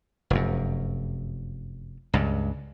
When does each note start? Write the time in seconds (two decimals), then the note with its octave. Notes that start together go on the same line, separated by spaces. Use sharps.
0.30 F1 F#2
2.14 C#2 G2